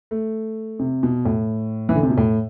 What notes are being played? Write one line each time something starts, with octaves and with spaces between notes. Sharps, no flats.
A3
C3
B2
A2
E3
D3
C3
B2
A2